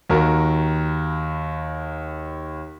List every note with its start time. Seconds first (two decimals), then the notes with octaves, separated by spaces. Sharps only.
0.10 D#2 F#4 A#4